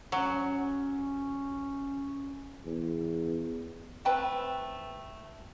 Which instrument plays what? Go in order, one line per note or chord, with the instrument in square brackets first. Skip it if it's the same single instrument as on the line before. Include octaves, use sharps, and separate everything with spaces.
[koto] F#3 [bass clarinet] C#4
[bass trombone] E2
[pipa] A3 C4 B4 G5